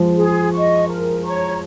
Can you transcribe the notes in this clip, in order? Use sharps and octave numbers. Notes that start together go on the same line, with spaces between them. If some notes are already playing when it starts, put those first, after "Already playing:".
Already playing: F3 G#3
G#4
D#5 C#6
A#4
C#5 A#5 C#6